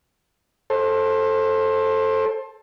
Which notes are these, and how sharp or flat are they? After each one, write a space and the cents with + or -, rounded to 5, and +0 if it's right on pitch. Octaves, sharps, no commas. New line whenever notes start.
A4 +0 C5 +25